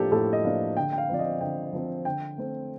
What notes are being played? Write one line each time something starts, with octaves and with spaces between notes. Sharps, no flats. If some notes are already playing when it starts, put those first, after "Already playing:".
Already playing: A2 F3 A#3 D4 G4 A4
A2 A4
D#5
F3 A#3 D4 F5
D3 G5
G5
F5
F3 C4 D5
D#5
D3 G5
F3 C4
D3 G5
A3 C4